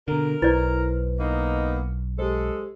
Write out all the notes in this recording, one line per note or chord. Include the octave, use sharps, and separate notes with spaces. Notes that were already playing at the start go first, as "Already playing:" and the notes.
B2 D3 A#4
B1 E4 B4 C5 D5
A#3 B3 D#4
G#3 G4 A4 C5